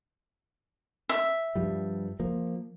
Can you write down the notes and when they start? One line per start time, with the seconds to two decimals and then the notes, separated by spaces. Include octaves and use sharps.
1.09 E5
1.55 G2 F3 G3
2.20 F3 A#3